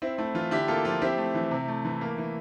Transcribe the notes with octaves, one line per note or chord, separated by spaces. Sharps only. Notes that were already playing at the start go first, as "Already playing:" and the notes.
C4 E4
A3 E4
E3 F4
D3 E4 G4
A#3 F4 A4
F3 F4
C4 E4 G4
A3
E3
C3
A3
E3
A#3
E3